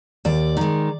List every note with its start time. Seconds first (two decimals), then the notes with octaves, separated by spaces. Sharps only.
0.25 D#2 D5
0.57 D#3 G#3